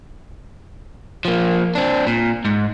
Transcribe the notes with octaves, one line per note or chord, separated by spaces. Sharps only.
F3 A#3
C4 D4
A#2
G#2